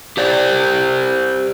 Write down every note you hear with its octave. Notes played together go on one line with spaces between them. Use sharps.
G4 C5 D5